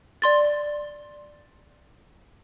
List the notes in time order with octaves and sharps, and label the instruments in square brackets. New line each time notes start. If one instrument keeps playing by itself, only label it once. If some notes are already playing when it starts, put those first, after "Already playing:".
[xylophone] D5 C6 A6